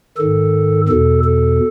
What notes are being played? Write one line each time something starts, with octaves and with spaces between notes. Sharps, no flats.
G#2 D#3 A4
E2 B2 A4
A4